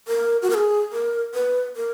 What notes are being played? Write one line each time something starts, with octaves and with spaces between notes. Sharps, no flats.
A#4
F#4
A#4
G#4
A#4
B4
A#4